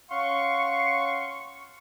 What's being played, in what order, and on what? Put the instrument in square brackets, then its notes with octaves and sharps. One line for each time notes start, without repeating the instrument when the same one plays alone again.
[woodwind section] C#4 F5 F#5 C6 C#6